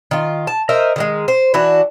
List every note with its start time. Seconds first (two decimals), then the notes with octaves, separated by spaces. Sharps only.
0.11 D#3 F4
0.47 A5
0.69 A#4 C5 D#5 E5
0.96 D#3 G3 G#3
1.28 C5
1.54 E3 D4 F#4